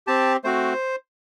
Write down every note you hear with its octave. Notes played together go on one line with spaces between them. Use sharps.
C4 G4 A5
A3 C4 F#4 C5